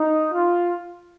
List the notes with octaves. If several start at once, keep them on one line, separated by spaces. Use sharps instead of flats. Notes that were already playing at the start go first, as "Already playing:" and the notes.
Already playing: D#4
F4